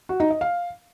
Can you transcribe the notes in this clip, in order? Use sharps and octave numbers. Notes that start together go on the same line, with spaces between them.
F#4
D#4
D#5
F5